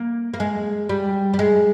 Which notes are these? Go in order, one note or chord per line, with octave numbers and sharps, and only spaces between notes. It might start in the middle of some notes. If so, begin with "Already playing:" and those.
Already playing: A#3
A#3
G#3
G3
G3
G#3